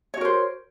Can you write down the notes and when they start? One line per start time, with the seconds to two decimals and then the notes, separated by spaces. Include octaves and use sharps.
0.14 C#5
0.17 F#4
0.21 A#4
0.25 C5